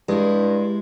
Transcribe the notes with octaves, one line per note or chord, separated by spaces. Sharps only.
G2 G#3 E4